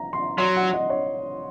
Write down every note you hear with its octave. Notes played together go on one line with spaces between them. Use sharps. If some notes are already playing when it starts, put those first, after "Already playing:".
Already playing: A#5
C6
F#3 C6
F#5
D#5
C#5